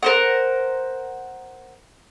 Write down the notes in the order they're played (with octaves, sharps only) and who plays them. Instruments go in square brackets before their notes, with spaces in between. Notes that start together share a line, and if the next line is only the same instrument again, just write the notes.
[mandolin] A#4 C5 F#5